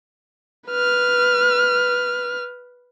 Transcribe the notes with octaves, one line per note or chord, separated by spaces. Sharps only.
B4 F6